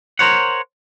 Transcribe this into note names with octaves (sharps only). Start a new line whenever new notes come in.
A#4 C5 C#5 F#5